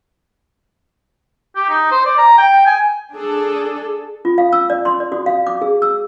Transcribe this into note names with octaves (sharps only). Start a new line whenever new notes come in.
G4
D#4
C5
D5
A#5
G5
G#5
D4 G#4 A4
F4
F5
E6
D5
C6
D5
F#4
F5
D6
G#4
E6